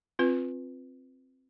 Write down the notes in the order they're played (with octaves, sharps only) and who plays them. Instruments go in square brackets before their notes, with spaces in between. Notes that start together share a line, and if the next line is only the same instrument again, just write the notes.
[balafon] C4 F4 B4